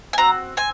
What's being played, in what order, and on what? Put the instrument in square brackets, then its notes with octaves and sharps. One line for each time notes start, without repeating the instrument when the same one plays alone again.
[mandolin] G#5
C4 F#4 A#5
C4 G#5